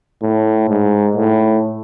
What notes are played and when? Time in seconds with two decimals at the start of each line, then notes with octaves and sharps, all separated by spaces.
0.22 A2
0.69 G#2
1.17 A2